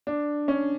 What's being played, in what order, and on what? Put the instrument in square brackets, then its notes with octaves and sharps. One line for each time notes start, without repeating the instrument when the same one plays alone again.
[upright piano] D4
C#4